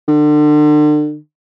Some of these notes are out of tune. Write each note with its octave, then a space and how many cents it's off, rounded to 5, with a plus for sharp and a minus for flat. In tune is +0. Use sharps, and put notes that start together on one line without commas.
D3 +35